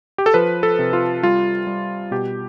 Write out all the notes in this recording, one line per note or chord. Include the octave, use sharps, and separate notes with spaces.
G4
A4
F3 B4
A4
C3
F4
G3 F4
G3
B2 G4